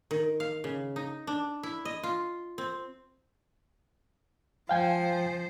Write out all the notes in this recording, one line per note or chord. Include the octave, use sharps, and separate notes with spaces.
D#3
F5
C#3
D#4
D4
E4
D#5
F4
C4
F3 C5 F5 G5 G#5